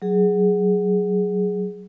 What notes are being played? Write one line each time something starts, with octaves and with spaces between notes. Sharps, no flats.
F#3 G#4